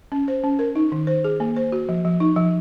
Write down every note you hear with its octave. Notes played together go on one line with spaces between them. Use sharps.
C#4
C5
C#4
A#4
D#4
D#3
C5
G#4
A#3
C5
F#4
F3
F3
D#4
F3